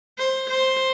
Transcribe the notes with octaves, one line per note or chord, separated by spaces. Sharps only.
C5
C5